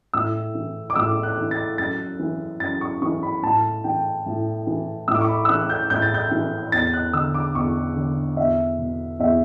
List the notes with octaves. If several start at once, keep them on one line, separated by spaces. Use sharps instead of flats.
A2 E6
E3
D6
A2 E6
F#6
E3
A6
F#2 A6
E3
F#2 A6
C#6
E3 C#6
B5
A2 A5
E3 G5
A2
E3
A2 E6
D6
C#6
B5
E6
E3 F#6
G6
A2 G6
A6
G6
E3
E2 A6
F#6
D3 E6
D6
E2 C#6
D3
E2 E5
B2
E2 E5